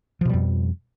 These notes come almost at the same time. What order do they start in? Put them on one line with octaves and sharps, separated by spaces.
F3 B2 G3 F2